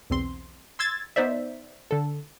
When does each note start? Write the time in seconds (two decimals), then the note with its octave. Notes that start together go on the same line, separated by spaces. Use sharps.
0.10 B1 E2 C4 C6
0.79 C6 E6 G#6 A6
1.16 B3 D#4 C5 D5 E5
1.91 D3 A4